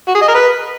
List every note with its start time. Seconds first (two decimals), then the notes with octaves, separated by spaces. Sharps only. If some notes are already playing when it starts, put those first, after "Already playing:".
0.08 F#4
0.15 G#4
0.21 D#5
0.28 A#4
0.35 B4